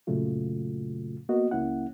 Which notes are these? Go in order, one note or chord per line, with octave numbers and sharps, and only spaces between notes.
F#2 A#2 C#3 F#3 A3 F4
A#3 B3 F#4 D#5
C#2 A#3 C#4 E4 F#5